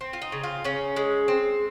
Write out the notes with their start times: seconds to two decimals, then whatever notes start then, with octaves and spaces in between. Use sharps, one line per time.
0.01 C4
0.13 F4
0.22 D#4
0.32 C#3
0.44 F4
0.64 C#3 C#4
0.96 G#3
1.28 C4